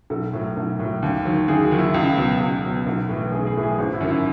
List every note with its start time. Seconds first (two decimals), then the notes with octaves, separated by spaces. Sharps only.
0.10 B1 A4
0.33 A2 F#3
0.56 B1
0.79 A2 F#3
1.02 D#2
1.25 D#3 F#3
1.48 D#2 G#4
1.63 F#4
1.71 D#3 F#3
1.78 E4
1.94 C#2 F#4
2.17 B2 F#3
2.40 C#2
2.63 B2 F#3
2.86 B1
3.09 A2 E3
3.32 B1 G#4
3.47 G#4
3.55 A2 E3
3.63 G#4
3.78 G#1 F#4
3.93 E4
4.01 F#2 D#3 F#3
4.09 E4